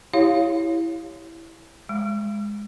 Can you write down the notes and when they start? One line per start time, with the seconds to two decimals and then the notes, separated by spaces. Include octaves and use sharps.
0.13 E4 G4 C#5 F5
1.89 G#3